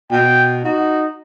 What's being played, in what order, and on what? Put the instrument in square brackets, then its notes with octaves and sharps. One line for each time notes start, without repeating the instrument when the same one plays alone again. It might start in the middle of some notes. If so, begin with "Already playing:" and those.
[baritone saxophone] B2 [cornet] G5
[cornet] D#4 [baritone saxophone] F#4